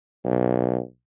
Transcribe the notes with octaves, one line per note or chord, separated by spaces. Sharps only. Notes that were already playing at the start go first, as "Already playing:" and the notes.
B1